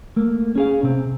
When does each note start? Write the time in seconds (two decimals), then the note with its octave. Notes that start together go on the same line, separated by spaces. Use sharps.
0.16 A3 A#3
0.55 C#4 G#4 F5
0.83 C3 C4